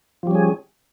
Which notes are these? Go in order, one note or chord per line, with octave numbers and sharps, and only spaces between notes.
F3 G3 C#4 G#4